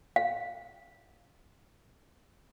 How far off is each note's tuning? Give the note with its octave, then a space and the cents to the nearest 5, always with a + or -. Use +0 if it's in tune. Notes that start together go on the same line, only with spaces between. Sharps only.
F5 +5